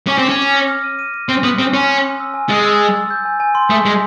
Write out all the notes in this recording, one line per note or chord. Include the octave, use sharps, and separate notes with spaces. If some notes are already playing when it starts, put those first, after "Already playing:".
C#4 D6
C4 D6
C#4
D6
A#6
F6
D#7
D#7
D#7
C4 C6
B3 F#6
C4 D#6
C#4 C6
G#5
G#5
E6
G#5
G#3 A6
E6
A6
E6
G6
G#5
G#5
C6
A3 D#6
G#3 B6